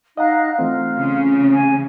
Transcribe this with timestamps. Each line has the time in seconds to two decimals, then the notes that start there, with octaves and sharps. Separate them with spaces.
0.17 D#4 D#5 F5 F#5 A#5 F#6
0.59 E3 A3 C4 F4
0.98 C#3
1.52 G#5